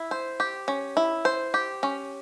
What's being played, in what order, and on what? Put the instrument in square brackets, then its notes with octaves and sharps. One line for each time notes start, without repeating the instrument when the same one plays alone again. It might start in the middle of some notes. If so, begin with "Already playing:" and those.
Already playing: [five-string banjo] E4
C5
G4
C#4
E4
C5
G4
C#4